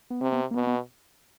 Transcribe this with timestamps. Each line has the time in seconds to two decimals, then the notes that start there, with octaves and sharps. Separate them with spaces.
0.10 B3
0.21 C3 C4
0.32 B3
0.51 A#3
0.55 B2 B3
0.67 B3